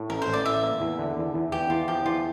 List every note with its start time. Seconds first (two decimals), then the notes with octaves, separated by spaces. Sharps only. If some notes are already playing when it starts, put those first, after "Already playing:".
Already playing: A2
0.10 A1 A#4
0.22 C5
0.28 A1
0.33 D5
0.45 E3 E5
0.63 A#3
0.81 E2
0.99 D3
1.17 E2
1.34 E2
1.52 E2 G4
1.70 E2 F4
1.88 F3 G4
2.05 E2 F4